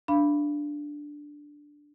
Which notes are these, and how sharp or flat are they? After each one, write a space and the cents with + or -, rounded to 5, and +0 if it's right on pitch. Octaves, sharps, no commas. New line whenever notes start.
D4 +0 F5 -30 B5 +0